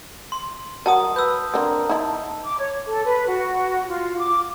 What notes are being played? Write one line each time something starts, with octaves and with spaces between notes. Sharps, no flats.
C6
F#3 A#4 F#5 A5 D#6
B4 E6 G6
D3 C4 A#4
D#4 E4 A5
D6
C#5
A4
B4
F#4
F4
D6